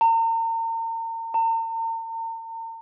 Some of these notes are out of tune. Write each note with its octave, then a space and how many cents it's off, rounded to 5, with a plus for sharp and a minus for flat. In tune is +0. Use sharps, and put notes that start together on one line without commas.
A#5 -40
A#5 -45